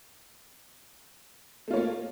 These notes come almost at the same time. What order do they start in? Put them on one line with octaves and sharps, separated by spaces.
A3 F4 C#5 A#3